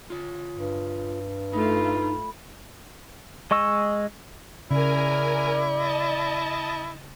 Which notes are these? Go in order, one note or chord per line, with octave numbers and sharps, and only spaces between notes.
F4 C#5
G2
A3 D#4 F4 B5
G#3 D#5 C#6 E6
C#3 E4 A#4 D5 G#5
D#5 A5